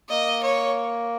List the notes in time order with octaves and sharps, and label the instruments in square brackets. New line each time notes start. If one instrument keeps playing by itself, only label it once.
[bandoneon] A#3 [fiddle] D#5
[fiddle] C#5